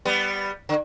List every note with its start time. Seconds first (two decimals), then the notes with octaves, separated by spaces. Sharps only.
0.05 G3 B3
0.69 D3